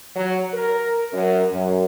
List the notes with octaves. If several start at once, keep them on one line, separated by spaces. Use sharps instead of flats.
F#3
A#4
F#2
F#2